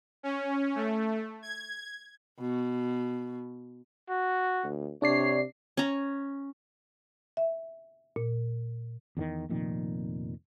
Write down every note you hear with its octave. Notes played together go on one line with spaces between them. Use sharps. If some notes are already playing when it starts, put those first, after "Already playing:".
C#4
A3
G#6
B2
F#4
D2
C3 D4 C#5 D5 C7
C#4 A#5
E5
A#2
E2 D3 D#3
F1 F2 A#2 D#3